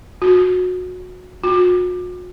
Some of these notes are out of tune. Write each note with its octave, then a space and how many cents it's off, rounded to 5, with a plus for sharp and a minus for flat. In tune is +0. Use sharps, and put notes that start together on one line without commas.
F#4 -25
F#4 -45